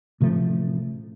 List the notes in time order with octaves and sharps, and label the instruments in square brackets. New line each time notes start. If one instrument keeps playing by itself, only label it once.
[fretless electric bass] A1 C3 F3 A3